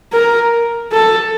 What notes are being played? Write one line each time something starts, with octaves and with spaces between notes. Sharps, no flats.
A#4
A4